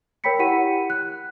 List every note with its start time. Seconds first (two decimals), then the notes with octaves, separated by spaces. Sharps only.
0.24 A#4 C#5 G5 B5 B6 C#7
0.39 E4 G4 F#5 B5 D#7
0.90 F#6